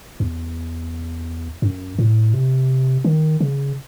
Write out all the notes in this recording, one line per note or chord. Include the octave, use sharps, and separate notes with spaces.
E2
F#2
A2
C3
D#3
C#3